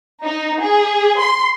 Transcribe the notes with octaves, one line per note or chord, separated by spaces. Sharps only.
D#4
G#4
C6